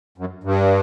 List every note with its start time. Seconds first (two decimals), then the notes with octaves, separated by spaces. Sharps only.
0.18 F#2
0.43 G2